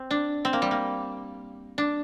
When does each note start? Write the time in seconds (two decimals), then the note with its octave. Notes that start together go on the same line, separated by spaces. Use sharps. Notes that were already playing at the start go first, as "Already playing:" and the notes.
Already playing: C4
0.11 D4
0.45 C4
0.53 A#3
0.62 G3
0.71 A#3
1.78 D4